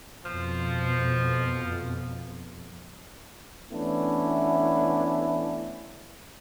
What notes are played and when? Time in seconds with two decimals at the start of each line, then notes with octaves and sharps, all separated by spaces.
0.25 F2 B2 F3
3.72 E3 A3 B3 C#4 D4 E4